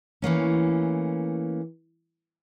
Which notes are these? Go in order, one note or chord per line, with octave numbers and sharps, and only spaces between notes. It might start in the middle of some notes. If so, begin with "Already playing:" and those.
E3 A3 A#3 C#4